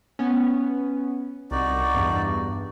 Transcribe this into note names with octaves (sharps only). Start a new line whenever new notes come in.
B3 C#4
C2 D#4 F#4 D5
E2 G2